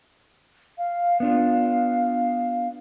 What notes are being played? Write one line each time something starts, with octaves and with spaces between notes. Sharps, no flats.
F5
B3 D4 F4 F5